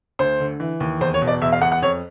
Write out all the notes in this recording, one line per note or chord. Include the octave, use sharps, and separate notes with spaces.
D2 C5
D3
E3
D#2
E2 C5
C#5
B2
D5
E2 E5
F5
E2 F#5
F#5
F2 C#5